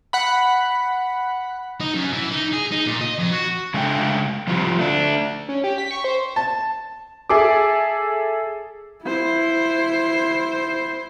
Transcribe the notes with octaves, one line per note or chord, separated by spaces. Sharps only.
F#5 B5
D#4
F#2
E3
D#4
G#4
D#4
A#2
D#5
F2
F#4
C#3 G#3 A3 D4 C#5 G5
F3 G3 C4 F4
A3 D4
C#4
G4
B6
C#6
C5
A5
G#4 A4 E5 D6
E4 C5